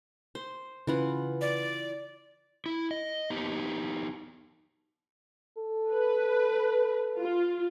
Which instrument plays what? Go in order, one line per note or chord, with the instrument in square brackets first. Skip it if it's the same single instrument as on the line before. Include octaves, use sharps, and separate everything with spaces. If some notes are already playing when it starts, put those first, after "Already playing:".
[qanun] C5
[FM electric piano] C#3 B4 [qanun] E3 F4 F#5
[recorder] D5
[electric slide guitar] E4
D#5
B3 D#4 G4
[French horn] A4
[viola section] B4
F4